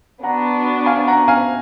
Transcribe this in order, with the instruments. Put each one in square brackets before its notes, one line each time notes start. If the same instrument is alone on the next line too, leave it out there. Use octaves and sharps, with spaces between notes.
[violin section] B3 D4 F#4 [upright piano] F#5 A#5
[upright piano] F5 G#5
F#5 A#5
F5 G#5